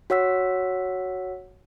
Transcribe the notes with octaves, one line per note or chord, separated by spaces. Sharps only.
F#4 C#5 F#5 E6 B6